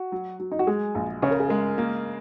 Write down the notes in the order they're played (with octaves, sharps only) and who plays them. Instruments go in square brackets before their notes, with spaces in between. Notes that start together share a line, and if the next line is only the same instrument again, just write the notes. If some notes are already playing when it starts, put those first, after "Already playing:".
Already playing: [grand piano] F#4
[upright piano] F#3
F#3
[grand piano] D#4
F#4
[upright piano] G#3 [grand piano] G#4
[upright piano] A#1
[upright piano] C#3 [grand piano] C#5
[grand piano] A#4
G#4
[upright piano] G#3 [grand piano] A#4
[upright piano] A#3